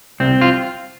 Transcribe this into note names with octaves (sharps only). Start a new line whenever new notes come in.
C2 C4
F4